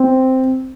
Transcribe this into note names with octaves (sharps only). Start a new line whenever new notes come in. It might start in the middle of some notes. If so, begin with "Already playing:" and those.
Already playing: C4